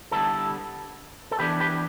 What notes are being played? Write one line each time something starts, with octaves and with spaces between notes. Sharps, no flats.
D3 G3 B3 E4 A4
A4
E3 B3 D4 G4 B4
G4 B4